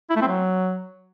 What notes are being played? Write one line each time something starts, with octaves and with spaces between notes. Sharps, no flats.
E4
A3
C4
F#3